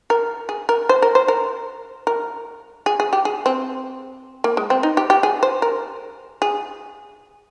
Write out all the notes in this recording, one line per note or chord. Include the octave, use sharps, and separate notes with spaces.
A#4
G#4
A#4
C5
A#4
C5
A#4
A#4
G#4
G#4
G4
G#4
C4
A#3
G#3
C4
D#4
G4
G4
G#4
C5
A#4
G#4